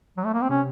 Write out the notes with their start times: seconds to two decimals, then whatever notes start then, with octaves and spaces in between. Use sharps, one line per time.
0.17 F#3
0.25 A3
0.34 A#3
0.42 C4
0.49 C3 C#4